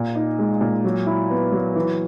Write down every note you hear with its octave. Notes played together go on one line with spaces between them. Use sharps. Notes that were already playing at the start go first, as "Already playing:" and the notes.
Already playing: A#2
D#4
G#3
A#2
F#3
E4
B3
F#3
E3